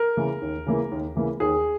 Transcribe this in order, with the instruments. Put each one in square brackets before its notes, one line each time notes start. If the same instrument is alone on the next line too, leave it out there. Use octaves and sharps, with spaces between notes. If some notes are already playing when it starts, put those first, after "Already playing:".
Already playing: [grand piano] A#4
C#3 E3 A#3
D#2
C#3 E3 A#3
D#2
C#3 E3 A#3
D#2 G#4